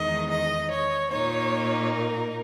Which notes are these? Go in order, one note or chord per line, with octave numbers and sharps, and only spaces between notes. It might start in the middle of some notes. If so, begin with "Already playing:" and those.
Already playing: E2 D#3 G#3 D#4 D#5
D#5
C#5
A#2 A#3 D#4 C#5
A#4